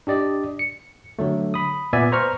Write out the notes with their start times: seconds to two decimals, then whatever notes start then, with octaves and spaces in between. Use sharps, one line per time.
0.07 D4 G4 D5 D#5
0.59 C#7
1.19 D3 F#3 A3
1.54 B5 D#6
1.93 A#2 B3 D5 E5 G#5
2.12 B4 C5 A#5 C#6 F6